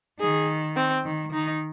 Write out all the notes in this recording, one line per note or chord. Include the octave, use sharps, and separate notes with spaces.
D#3 G#4
C4
D#3
D#3 D#4